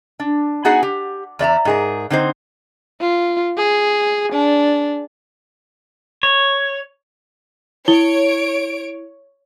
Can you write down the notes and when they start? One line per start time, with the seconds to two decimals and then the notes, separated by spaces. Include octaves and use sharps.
0.20 D4
0.65 B3 D#4 F#4 G#4 F#5 G#5
0.83 G4
1.39 E2 D5 E5 A#5
1.65 G#2 G#4 A#4
2.10 D3 C4 D#4 C5
3.01 F4
3.57 G#4
4.32 D4
6.23 C#5
7.88 E4 C#5 D7 G7